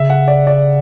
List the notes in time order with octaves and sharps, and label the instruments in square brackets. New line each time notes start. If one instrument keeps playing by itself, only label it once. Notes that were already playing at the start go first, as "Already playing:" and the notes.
Already playing: [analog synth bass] C#3 [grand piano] E5
[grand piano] F#5
D5
D5